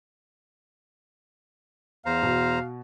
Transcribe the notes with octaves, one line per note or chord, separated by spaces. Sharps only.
E2 C5 F5 A#5
B2